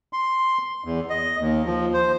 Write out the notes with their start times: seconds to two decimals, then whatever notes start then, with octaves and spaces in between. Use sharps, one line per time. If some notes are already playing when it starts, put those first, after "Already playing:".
0.13 C6
0.84 E2
1.10 D#5
1.40 D#2
1.65 F3
1.94 C5